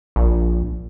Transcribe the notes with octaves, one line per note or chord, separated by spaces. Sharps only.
A#1